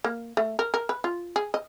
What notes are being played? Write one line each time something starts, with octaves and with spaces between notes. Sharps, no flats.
A#3
A3
A#4
A#4
B4
F4
G#4
D#5